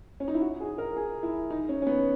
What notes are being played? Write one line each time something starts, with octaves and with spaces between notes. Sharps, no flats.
C#4
D#4
E4
F#4
G#4
A#4
G#4
E4
D#4
C#4
C#4
B3